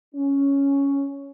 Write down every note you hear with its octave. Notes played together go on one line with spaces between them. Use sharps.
C#4